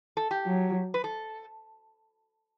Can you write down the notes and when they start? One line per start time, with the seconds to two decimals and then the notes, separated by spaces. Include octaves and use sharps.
0.17 A4
0.31 G4
0.46 F#3
0.94 B4
1.04 A4